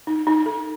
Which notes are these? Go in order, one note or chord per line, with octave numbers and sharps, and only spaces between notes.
D#4
D#4
A4